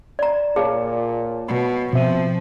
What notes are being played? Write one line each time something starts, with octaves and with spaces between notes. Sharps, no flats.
D5 A#5
A#2 G#4 C#5 F5 A5
B2
B2 F3 C4 E5 D#7